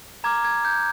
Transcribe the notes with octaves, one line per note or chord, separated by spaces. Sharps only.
A#5 D6 F6 G#6
G#6
G6